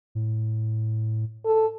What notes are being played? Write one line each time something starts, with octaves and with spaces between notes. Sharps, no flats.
A2
A4